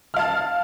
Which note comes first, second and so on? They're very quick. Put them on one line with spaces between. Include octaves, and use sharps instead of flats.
F6 F5 A5